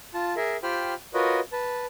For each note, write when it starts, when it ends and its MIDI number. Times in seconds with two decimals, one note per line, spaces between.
0.14 0.35 65
0.14 0.35 81
0.36 0.57 68
0.36 0.57 70
0.36 0.57 76
0.63 0.94 65
0.63 0.94 67
0.63 0.94 72
0.63 0.94 79
0.63 0.94 83
0.63 0.94 89
1.14 1.40 65
1.14 1.40 66
1.14 1.40 70
1.14 1.40 71
1.14 1.40 73
1.14 1.40 75
1.52 1.86 71
1.52 1.86 81